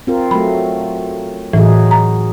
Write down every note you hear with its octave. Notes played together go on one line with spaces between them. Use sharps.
C4 F4 A#4
F#3 A3 B5
A2 E3 F#3 D#4 G#4
A#5